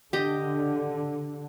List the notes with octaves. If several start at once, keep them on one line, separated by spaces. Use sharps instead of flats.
D3 G4 D#5